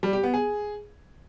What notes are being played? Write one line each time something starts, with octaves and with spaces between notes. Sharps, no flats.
G3
G4
B3
G#4